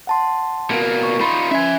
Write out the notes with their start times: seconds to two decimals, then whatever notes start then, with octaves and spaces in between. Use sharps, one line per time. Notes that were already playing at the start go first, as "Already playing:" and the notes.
0.07 F#5 A5 C6
0.71 B2 A#3
1.03 C#6
1.21 D#4 F4 B5 C6
1.51 C#4 E5 G#5